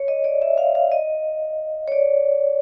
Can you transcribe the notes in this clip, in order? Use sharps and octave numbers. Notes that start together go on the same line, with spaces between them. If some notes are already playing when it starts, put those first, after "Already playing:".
Already playing: C#5
D#5
D5
E5
F5
F5
D#5
C#5
D5